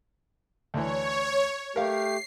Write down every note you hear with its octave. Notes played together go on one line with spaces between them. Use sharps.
D2 E3 C#5
A3 G4 A#4 F5 C7